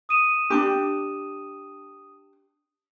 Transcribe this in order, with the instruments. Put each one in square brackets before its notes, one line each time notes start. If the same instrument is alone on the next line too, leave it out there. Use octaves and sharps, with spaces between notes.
[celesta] D#6 D#7 E7
[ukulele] D4 D#4 G4